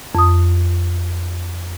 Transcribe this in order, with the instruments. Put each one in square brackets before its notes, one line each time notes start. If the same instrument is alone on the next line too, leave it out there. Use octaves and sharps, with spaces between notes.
[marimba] F2 D#6